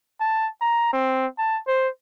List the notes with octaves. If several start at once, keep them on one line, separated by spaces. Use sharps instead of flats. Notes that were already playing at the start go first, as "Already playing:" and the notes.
A5
A#5
C4
A5
C5